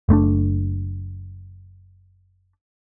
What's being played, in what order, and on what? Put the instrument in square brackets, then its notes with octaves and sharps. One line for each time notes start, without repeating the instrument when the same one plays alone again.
[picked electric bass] F#1 A3 C4 D4